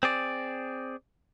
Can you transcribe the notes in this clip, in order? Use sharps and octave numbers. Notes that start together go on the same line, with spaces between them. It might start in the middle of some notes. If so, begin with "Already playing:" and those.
C4 G#4 D5